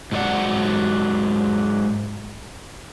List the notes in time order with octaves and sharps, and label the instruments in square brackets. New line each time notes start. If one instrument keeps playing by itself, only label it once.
[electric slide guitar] G#2 F#3 E4 D5 F#5